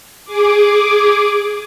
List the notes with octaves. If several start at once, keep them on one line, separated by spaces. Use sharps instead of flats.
G#4 D6